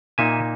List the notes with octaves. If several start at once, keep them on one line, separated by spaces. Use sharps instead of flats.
A#2 A#3 D#4 E5 G#5